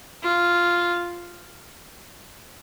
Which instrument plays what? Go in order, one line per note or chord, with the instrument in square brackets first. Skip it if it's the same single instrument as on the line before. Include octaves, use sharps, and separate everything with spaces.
[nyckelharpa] F4